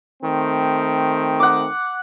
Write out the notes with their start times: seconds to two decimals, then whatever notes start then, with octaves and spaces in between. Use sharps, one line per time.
0.22 D#3 A3 C4
1.40 F#5 D6